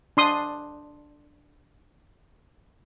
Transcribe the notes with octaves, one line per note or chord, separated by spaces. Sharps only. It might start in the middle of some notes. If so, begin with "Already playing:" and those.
D4 C6 D#6